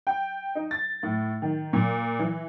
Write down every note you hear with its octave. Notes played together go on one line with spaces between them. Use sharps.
G5
D#4
A6
A2
D#3
A#2
E3